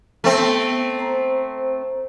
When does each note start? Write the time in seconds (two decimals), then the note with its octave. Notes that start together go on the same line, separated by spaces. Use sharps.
0.24 A3 B3 C4
0.99 C5 A#5